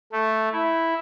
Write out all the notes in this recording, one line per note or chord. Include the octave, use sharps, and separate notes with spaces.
A3
E4